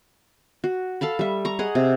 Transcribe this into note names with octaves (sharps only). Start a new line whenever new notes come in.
F#4
A4 F5 A5 B5
G3 E5
A#5 C#6
G#4 D#5 F#5
C3